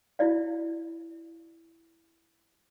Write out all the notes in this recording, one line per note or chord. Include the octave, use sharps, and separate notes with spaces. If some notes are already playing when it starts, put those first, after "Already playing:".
E4 F#4 D5 F5